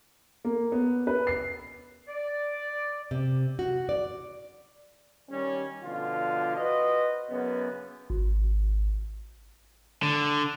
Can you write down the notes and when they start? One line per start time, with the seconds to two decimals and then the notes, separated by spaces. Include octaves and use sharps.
0.45 A#3
0.72 B3
1.07 B4
1.27 C7
2.08 D5
3.11 C3
3.59 F#4
3.89 D5
5.30 D#3 G3 C#4
5.83 B2 D3 F3 F4
6.57 F#4 B4 C5 D#5
7.30 F#2 C#3 B3
8.10 G#1
10.03 D3